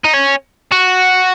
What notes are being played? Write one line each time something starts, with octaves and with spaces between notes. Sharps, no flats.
D#4
C#4
F#4